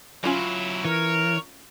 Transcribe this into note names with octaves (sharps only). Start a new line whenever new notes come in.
F#3 C#4 E4 F4 B5
E3 A#4 C#5